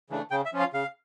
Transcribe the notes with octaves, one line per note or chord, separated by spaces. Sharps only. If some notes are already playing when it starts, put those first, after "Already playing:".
C#3 E3 A3 D4
C#3 G5
E5
F3 C#4 F4
F5
C#3 F5